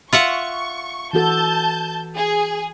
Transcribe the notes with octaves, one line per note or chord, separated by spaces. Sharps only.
F4 E5 F#5 C#6
E3 F#4 A4 A5 G6
G#4